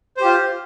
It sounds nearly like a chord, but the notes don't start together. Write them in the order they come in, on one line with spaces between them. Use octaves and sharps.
C5 G4 F4